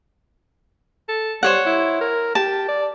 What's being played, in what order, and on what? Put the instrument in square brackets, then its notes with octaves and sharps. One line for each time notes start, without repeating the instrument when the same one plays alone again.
[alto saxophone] A4
[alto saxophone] G3 [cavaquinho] C5 C#5 F#5
[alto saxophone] E4
A#4
[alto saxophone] G4 [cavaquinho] A5
[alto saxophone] D5